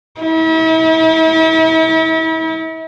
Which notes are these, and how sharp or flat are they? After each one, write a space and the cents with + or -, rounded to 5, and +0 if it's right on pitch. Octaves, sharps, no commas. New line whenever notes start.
E4 -40